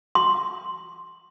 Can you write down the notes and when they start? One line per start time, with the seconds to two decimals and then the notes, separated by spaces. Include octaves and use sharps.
0.15 C6